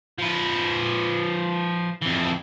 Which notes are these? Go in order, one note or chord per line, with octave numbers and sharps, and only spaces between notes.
F3 B4
F2 E3